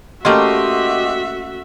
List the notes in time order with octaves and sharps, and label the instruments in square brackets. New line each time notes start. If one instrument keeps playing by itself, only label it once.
[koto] A3 A#3 C#4 [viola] F#4 E5 [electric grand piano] G4 D#5 C6